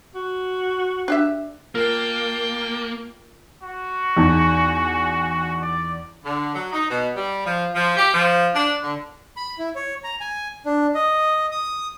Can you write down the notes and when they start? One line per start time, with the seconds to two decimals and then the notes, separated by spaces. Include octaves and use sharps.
0.15 F#4
1.08 D4 G4 E5
1.75 A#3 F4 A#4 G5 A5
3.63 F#4
4.17 E2 D#4 G#5 A5
5.62 D5
6.24 D3
6.55 F#3
6.72 D#4
6.90 B2
7.15 G3
7.46 F3
7.74 F3
7.97 G4
8.12 F3
8.54 D4
8.82 D3
9.37 B5
9.59 E4
9.75 C#5
10.04 A#5
10.20 G#5
10.66 D4
10.95 D#5
11.51 D#6